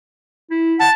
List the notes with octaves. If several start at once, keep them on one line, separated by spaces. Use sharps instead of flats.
E4
F#5 A5